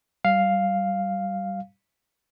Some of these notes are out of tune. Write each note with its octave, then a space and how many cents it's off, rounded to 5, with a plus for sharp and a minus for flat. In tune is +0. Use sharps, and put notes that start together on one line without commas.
G3 -20 F5 +0